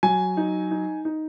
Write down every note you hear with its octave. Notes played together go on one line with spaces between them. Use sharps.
F#3 G#5
D#4
D#4
D#4